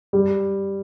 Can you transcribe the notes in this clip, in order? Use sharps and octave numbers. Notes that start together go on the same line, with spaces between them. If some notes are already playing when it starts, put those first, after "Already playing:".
G3